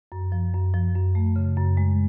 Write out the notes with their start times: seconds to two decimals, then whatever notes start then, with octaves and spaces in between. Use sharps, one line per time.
0.12 F#2
0.32 F3
0.53 F#2
0.74 F3
0.95 F#2
1.15 A3
1.36 C#3
1.57 F#2
1.77 G#3